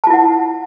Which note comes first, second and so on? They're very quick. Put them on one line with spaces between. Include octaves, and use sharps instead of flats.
A5 F4 E4 F#5